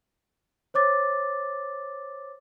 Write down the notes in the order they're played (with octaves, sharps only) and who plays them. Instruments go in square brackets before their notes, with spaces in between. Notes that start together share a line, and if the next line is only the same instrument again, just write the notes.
[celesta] C5 C#5 D6 A6